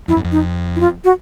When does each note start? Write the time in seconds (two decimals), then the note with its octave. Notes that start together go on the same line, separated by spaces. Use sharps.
0.08 F2 E4
0.16 F#2
0.24 F2
0.32 D#4
0.76 E4
0.80 F4
1.05 F#4